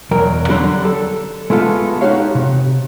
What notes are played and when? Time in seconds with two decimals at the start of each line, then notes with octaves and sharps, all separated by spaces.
0.11 B1 E2 F#3 A#4 G5
0.48 D3 F#3 G3 D4 B5 C6
0.85 A4
1.50 G#3 A3 B3 F4 A4
2.01 D#4 F#4 G4 C#5 F5
2.35 C3